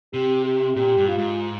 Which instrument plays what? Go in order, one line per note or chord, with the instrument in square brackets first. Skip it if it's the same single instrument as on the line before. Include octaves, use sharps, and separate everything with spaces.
[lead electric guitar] C3 [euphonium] G4
[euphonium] G4
[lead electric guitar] A#2 [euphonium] G4
[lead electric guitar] G2
[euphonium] F4
[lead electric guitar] G#2